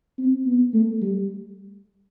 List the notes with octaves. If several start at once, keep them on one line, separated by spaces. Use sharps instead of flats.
C4
B3
A3
G3